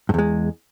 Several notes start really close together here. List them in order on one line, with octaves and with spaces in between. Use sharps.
G2 E2 G#3